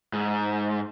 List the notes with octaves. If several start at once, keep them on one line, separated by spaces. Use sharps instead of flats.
G#2